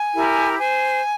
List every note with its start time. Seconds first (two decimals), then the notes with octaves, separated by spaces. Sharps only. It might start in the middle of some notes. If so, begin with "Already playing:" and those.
Already playing: G#5
0.14 E4 G4 A#4
0.58 C5 G#5